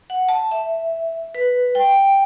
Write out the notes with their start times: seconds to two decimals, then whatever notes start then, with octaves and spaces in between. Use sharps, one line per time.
0.10 F#5
0.29 A5
0.51 E5
1.35 B4
1.75 G5